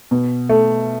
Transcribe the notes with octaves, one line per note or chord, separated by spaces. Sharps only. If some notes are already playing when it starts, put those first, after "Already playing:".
B2
A3